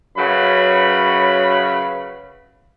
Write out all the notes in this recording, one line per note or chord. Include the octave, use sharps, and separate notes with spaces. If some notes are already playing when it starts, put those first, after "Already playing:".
F#2 C#3 F#3 B4 B5